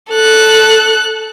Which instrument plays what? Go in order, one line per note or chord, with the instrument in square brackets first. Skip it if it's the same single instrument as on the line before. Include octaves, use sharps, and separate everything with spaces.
[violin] A4 F#6